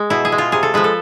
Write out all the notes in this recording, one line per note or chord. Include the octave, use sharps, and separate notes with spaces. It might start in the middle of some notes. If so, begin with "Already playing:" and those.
Already playing: G#3
B2 E4
G#4
G#3
F4
C3 G#4
A4
F3 G#3 B4
A4